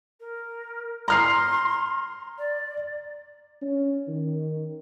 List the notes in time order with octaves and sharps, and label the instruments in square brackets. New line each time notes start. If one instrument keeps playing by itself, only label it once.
[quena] A#4
[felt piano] A#5 F6 C7 [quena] C6
[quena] D5
[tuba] C#4
D#3